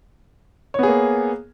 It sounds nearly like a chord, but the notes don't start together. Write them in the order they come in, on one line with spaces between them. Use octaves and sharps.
C#5 B3 G#4 A#3